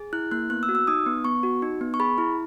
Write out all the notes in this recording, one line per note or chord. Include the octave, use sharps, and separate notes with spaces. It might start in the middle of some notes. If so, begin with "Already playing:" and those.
Already playing: G#4
E4 F#6
A#3 F#6
B3 F#6
E6
F#4
E6
D#4 D#6
B3
B3 C#6
F#4
D#4
B3
C#6
G#4 B5
E4